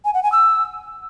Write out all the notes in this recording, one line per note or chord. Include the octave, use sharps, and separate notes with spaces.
G#5
F#5
G#5
E6